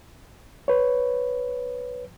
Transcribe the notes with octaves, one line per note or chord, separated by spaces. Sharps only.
B4 C#5